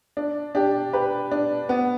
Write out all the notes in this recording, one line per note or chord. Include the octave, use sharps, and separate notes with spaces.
D4
D4 G4
G4 B4
D4
B3